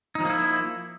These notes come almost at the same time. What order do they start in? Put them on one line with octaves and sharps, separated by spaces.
D#4 F3 A#3 E4